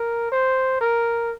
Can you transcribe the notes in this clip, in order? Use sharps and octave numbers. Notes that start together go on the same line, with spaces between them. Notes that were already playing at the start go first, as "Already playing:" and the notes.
Already playing: A#4
C5
A#4